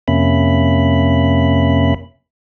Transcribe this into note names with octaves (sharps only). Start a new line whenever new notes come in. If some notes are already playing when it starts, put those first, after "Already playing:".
F2 C3 A#3 C#4 E5 B5